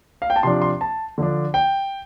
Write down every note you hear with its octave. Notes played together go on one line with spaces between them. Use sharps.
F5
G5
A5
C3 F3 D4 C6
C6
A5
D3 F3 D4
G5